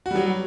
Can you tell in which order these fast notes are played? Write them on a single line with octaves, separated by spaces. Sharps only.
F#4 G3 F#3